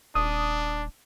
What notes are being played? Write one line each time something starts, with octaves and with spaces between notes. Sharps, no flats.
D#1 D4 D#6